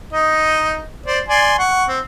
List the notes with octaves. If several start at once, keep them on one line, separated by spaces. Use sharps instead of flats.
D#4 D#5
C5 D5
D5 G#5 C6
F#5 C#6
C4